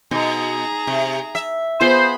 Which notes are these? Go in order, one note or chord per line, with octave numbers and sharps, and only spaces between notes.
B2 D#4 G#4 A#5
C3
E5
B3 F4 G#4 C5 B5